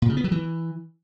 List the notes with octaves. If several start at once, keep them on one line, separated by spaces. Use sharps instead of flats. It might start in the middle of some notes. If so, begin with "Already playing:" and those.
A#2
C#3
B3
F#3
E3